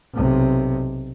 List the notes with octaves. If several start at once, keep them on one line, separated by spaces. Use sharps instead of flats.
B1 C3